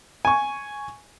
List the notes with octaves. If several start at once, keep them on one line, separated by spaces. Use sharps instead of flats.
G#5 C#6